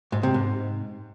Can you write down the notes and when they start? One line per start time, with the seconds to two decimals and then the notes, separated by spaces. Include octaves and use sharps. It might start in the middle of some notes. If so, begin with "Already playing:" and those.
0.12 G#2
0.23 C3
0.34 G#2